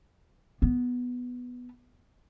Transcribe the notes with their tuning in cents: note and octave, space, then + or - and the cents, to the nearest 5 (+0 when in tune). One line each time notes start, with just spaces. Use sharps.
B3 +0